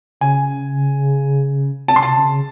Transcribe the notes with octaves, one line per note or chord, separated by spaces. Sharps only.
C#3 G#5
C3 A5
C6
A5
C#3